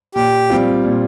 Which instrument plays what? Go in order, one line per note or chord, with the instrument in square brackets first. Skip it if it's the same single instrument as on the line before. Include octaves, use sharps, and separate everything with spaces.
[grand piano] A#2 [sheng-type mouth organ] G4
[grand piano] G3 C4 F4
A#2